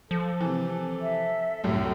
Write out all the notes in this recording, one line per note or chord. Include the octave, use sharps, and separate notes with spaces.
F3 A4
C3 E3
E5
C2 F#2 A2